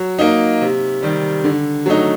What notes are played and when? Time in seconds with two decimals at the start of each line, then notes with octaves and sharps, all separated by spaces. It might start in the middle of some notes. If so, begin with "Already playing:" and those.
Already playing: F#3
0.19 A#3 D#4
0.61 C3
1.02 D#3 G3
1.44 D3
1.86 F#3 A3 D#4